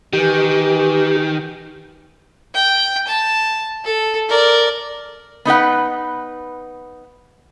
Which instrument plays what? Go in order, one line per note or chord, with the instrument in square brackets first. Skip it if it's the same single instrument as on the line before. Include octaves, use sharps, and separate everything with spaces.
[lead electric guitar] D#3 [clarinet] E3 [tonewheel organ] G4
[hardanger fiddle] G5
A5
A4
A#4 D5
[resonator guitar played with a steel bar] B3 D#4 B4 F#5